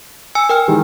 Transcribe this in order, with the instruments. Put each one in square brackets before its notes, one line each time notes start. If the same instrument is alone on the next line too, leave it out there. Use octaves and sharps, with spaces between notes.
[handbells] G#5 E6 C#7
A#4 G5 F6
[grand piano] D#3 E3 G#3